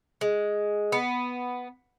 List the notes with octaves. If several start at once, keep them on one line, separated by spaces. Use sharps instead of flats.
G#3
B3